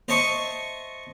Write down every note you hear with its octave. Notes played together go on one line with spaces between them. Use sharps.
C5 D#5 E5 A5 C#6